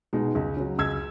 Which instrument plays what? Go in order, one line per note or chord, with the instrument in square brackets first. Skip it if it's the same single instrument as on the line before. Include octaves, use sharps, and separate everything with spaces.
[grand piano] B2 G#3 D#4
C#2
C#3 F#3
C#2 E6 G#6